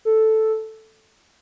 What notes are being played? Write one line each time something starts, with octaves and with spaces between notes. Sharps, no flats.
A4